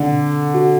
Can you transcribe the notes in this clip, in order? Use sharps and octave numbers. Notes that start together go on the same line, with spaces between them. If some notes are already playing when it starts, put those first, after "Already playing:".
Already playing: D3 C4
B2
F#4